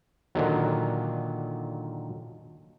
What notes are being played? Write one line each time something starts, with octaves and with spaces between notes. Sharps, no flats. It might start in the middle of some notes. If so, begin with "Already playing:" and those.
A#2 D3 D#3 F#3